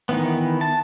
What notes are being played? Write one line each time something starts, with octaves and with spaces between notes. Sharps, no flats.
D#3 E3 B3
A5